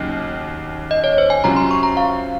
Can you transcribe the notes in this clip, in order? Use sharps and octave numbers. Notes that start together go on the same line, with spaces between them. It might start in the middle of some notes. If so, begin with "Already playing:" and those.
Already playing: D#2 C#3 F#3 D#5
D#5
C#5
C5
G#5
C3 F#3 C#4 F4 A#5
C6
C#6
A#5
F5